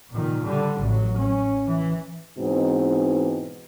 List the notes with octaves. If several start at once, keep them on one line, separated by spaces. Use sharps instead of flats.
A#2 D#3
D3 G3
A1 F#3
C#4
E3
G#2 B2 E3 C4 D#4